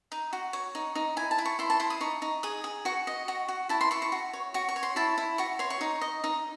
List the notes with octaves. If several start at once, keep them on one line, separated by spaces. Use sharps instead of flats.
D#4
F#4
C#5
D#4
D#4
E4 G#5
A5
E4
C#6
E4 C6
A5
E4 C6
D#6
D#4 C#6
D#4
G#4 D#6
G#4
F#4 C#6
D#5
F#4
F#4
E4 A5
C6
E4 C#6
C#6
F#4
C#5
F#4 C#6
C#6
C#5
C6
E4 A5
E4
F#4 C#6
C#5 C6
C#6
D#4
D#5
D#4